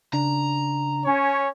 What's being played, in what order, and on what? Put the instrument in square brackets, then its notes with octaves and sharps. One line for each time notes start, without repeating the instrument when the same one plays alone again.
[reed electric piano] C#3 D4 [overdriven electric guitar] A#5
[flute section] C#4 [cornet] C#5